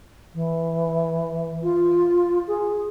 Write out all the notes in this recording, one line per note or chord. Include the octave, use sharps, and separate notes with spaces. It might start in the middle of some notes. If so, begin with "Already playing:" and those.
E3
F4
G#4